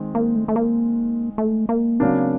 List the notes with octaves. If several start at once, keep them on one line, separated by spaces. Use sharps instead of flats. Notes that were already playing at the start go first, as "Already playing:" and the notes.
Already playing: D#3 G#3 C4
A#3
A3
A3
A#3
A3
A#3
C#3 F#3 A#3 C4 D4